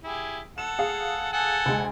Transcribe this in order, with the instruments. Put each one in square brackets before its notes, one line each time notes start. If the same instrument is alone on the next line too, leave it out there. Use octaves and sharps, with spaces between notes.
[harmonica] E4 G4 G#4
[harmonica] A4 F#5 [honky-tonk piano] E7
[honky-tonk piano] G#4 F5
[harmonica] A4 F#5 G#5
[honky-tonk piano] D2 G#3